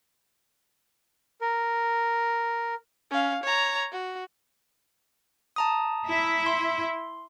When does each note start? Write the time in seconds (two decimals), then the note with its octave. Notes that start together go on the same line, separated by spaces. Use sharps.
1.41 A#4
3.10 C#4 F5
3.43 C#5 A#5
3.92 F#4
5.56 A5 A#5 D#6
6.06 E4 E5
6.46 C6